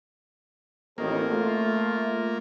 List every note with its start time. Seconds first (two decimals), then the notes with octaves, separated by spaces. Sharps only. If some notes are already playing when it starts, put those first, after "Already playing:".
0.98 A1 F2 D#3 A#3
1.31 A3 F4